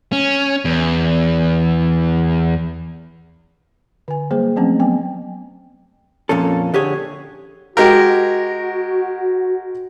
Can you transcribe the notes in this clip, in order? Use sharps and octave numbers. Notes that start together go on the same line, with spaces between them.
C#4
E2
D3 G#5
F#3 G3 A#3 G#4 C5
F3 F#3 A3 C4 C#4
F#3 B3 G5 G#5
F2 A#2 A#3 C#4 A4
D3 G4 G#4 C#5
G#3 F#4 G4 A#4